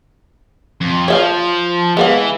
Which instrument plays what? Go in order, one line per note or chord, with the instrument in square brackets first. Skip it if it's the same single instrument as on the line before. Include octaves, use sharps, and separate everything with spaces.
[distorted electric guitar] F2
[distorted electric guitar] F3 [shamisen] C#5 E5 F5
[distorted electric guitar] E3 [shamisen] G#3 B3 F5